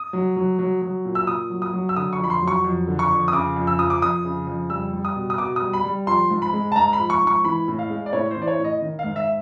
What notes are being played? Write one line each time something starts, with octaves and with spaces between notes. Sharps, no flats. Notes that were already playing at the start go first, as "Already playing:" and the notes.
Already playing: D#6
F#3
F#3
F#3
F#3
A#2
E6
A#2 D#6
F#3
D#6
F#3
E6
D3 D#6
C#6
F2
B5
C6
F#3
C#6
F2
D3
C#6
F2
D#6
C#3 D6
F2
E6
F3 D#6
D6
F2 D#6
C#3
F2
G3 E6
G3
D#6
B2
D#6
B2 D6
D#6
G3
B5
G3
F3 C6
G#2
B5
G#3
A5
G#2 A#5
B5
F3
C#6
G#2
C#6
E3 B5
A2
F5
G#3
D5
A2 C#5
C5
E3
D5
C#5
A2
D#5
D#3
F5
G#2
E5